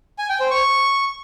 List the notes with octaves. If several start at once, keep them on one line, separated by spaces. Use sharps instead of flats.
G#5
G5
C5
C#6